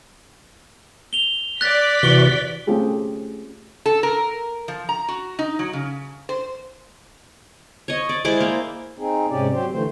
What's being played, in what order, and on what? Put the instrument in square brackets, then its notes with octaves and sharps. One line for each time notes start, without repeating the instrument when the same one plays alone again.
[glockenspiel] F7 G7
[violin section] D5 B6 [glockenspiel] F#6 A6
[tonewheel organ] C3 E3 F#4 [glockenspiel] G7
[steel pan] A3 C4 C#4 F4 G4 G#4
[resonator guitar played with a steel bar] A4
A#4
F3
A#5
F#4
D#4
F#3
C#3
C5
[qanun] C#5 D#5
D5
G#3 E4 C5 D5
A#3
[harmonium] C4 D#4 G#4
G#2 C3 C#4 G4 D5
F#3 C4 G4 C5
D3 E3 F3 A3 C5